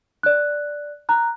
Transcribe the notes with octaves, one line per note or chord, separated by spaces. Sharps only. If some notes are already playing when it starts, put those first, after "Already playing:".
D5 F#6
A#5 F#6